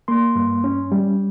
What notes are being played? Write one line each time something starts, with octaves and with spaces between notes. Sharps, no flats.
A#3 C6
G2
C#4
G3